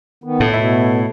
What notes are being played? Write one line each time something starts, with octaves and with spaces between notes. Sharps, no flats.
D#3 B3
A2 A3
B2 E4 E5 B5